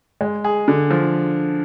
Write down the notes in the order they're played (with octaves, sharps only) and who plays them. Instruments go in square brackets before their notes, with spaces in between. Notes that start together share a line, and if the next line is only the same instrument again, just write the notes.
[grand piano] G#3
G#4
D3
F3